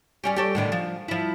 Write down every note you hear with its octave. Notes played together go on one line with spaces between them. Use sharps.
G3 C#4 G4
G4 A4 C#5
A2 D3 D#3
F3
F3 E4